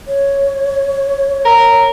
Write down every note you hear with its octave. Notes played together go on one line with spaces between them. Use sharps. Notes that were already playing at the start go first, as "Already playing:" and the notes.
C#5
A#4